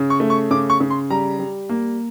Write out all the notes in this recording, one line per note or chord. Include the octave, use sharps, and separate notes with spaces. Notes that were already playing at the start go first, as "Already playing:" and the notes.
Already playing: C#3
C#6
A3
C#6
C#3 D6
C#6
C#3
C6
G3 A#5
G3
A#3